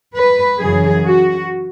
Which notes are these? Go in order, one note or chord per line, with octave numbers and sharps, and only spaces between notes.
B4
F#2 C#3 E3 G#4
F#4